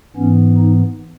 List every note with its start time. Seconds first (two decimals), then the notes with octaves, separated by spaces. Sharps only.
0.16 G#2 E3 B3 C#4
0.57 D#4